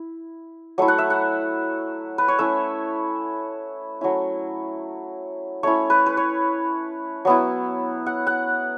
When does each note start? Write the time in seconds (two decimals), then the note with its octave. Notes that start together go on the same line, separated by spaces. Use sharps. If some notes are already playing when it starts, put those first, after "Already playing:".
Already playing: E4
0.78 F#3 A3 E4
0.88 F#5
0.98 E5
1.10 F#5
2.18 B4
2.28 C#5
2.39 A3 C#4 E4 E5
4.01 F#3 A3 C#4 E4
5.63 A3 C#4 E4 C#5
5.90 B4
6.06 B4
6.17 C#5
7.25 F#3 B3 E4
8.06 F#5
8.27 F#5